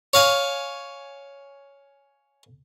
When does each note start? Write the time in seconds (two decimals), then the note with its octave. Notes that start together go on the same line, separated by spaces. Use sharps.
0.14 C#5 F5 G#5